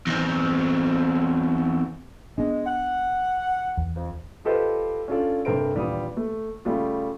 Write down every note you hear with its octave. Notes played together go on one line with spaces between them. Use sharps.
E2 C4
G#3 B3 D4
F#5
E2
F2
F4 G4 A4 B4 C5 D#5
C#4 D4 F4 A4 D5
G2 C3 A4 A#4 C5 D7
D#1 E2 G3 D4 F4 D#6
A3
C#3 G3 A3 F4